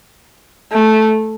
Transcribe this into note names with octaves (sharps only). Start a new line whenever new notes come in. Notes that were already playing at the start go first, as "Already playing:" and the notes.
A3